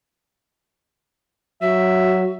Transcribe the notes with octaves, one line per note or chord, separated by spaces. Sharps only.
F#3 F#4 E5